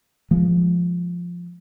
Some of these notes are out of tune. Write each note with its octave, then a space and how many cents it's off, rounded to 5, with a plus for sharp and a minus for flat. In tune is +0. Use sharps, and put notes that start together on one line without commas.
F3 +0 G#3 +0